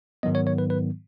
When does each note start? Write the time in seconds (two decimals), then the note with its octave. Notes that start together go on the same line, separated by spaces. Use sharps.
0.23 G#2 D#3 F#3 B3 D#5
0.35 C#5
0.47 C#5
0.58 B4
0.70 B4